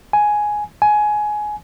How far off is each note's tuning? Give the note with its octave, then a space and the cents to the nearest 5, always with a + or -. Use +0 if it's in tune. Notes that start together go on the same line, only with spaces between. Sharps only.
G#5 +5
G#5 +15